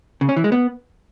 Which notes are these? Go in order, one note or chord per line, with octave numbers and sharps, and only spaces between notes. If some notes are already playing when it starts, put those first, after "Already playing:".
C#3
C#4
E3
G#3
B3